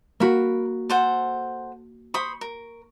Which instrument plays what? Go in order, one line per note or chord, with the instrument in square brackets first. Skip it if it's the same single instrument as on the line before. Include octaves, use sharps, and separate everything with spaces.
[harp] A#3 F#4 [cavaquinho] A#4 B5
[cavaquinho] A4 C5 F#5
[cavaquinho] C5 B5 D#6 [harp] C#6
[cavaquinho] A#4